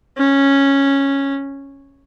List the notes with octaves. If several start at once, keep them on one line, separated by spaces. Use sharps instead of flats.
C#4